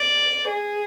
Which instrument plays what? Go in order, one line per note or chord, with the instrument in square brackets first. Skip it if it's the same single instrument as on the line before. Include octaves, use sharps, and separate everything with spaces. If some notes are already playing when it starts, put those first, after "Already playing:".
Already playing: [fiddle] D5
G#4